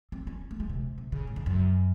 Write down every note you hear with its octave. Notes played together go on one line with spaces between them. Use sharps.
C4
C#4
A#3
G#3
C3
C3
C#3
G#2
F2
F#2